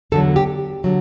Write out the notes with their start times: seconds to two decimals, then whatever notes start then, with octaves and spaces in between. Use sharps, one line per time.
0.12 E2 D3 F#3 A4
0.36 G4
0.84 D3 F#3